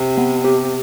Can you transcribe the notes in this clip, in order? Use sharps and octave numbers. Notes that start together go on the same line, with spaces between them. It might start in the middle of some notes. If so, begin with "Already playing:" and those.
Already playing: C3
B3
G4